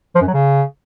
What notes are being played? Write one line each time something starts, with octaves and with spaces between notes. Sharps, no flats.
F3
F#2
F#3
C#3